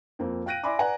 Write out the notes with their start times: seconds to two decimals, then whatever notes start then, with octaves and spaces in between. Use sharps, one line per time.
0.19 F2 A#3 C4
0.46 F5 G5 F#6 A#6 D7 D#7
0.64 D5 E5 G#5 B5 C6 D6
0.79 B4 D5 F#5 G#5 A#5